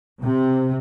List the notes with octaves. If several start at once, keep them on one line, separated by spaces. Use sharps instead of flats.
C3